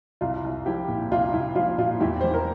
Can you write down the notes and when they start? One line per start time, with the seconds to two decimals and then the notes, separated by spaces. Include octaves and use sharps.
0.21 C2 F4
0.44 C2
0.66 F3 E4 G4
0.88 A#2
1.11 C2 F4
1.33 C2 E4
1.56 F3 F4
1.78 A#2 F4
2.00 E2 E4 G4
2.21 E2 C5
2.34 A#4